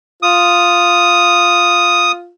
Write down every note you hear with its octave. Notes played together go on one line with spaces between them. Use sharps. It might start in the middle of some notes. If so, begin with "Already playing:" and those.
F4 D#6